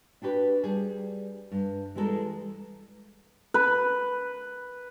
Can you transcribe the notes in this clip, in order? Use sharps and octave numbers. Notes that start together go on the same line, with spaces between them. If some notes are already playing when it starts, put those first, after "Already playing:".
D4 F#4 G4 B4
G3 G#4
G2
E3 G3 G#3 G4 A4 A#4
B4